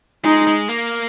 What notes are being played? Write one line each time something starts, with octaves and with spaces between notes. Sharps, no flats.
G#3 D#4
G#3
A#3